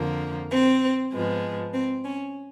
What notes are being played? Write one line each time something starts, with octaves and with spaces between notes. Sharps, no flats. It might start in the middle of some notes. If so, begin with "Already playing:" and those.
Already playing: F2 D3 F3 A#3
C4
G#2 F3 G#3 B3
C4
C#4